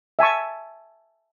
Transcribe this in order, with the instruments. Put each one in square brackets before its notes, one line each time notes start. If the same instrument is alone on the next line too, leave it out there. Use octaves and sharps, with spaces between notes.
[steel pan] E5 G#5 A5 C#6